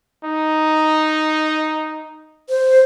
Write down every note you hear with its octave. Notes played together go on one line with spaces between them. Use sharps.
D#4
C5